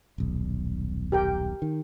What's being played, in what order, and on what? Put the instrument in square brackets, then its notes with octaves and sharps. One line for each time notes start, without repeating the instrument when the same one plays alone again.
[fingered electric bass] D#1 B1
[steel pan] G4 A#4 G5
[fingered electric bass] D#3